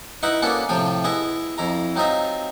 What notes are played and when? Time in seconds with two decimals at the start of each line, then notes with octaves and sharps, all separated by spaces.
0.23 D#4 E4 B4 D#5 E5 F#5
0.42 A#3 B3 C#4 D4 F#4 A4
0.69 A2 C3 F3 F4 G5
1.04 B3 E4 G#4 D#5 E5
1.58 F2 E4 A#5
1.96 F#3 C4 D#4 F4 D#5 E5